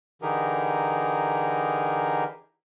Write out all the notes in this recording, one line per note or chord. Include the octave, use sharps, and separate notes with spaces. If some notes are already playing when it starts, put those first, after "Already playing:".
D3 E3 D#4 G4 G#4 A#4